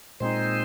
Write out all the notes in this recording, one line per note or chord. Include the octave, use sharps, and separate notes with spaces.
A#2 G#3 C4 D#4 C5